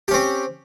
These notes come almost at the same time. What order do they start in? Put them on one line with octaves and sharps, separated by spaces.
G4 C#4 C4